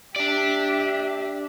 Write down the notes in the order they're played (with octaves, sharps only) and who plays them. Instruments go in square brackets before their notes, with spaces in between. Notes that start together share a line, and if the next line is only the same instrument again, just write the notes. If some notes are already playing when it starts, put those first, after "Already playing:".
[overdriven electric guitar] D4 D5 [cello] G4 E5